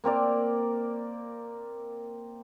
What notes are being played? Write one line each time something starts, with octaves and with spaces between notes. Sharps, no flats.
A#3 C4 A#4 D5